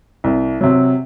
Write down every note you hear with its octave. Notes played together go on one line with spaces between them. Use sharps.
C2
C3 F#3